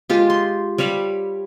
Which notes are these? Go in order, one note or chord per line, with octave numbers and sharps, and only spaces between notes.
G#3 F4 G4
C6
G3 C#5 F5 B5